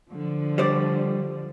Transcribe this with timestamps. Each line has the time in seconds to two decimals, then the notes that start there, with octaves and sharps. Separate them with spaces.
0.11 D3 F3
0.58 G3 C5 D5